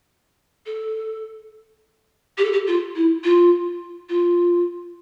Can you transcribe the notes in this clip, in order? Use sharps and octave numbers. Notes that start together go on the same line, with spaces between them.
A4
G4
A4
G4
F4
E4
F4
F4